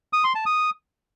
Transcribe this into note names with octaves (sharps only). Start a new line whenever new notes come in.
D#6
C6
A5
D#6